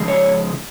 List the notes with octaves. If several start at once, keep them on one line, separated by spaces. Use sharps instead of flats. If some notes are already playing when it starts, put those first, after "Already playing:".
Already playing: C#3 F3 G#3
C#5